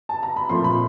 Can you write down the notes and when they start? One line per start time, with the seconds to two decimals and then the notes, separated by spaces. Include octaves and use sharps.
0.09 A5
0.23 A#5
0.37 B5
0.49 A#2 F3 A3 C4 C6
0.64 B5